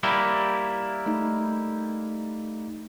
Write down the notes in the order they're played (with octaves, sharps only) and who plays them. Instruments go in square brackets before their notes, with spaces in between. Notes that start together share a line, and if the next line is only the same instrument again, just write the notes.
[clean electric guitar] G3 A#3 E4
[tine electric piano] A3 D#4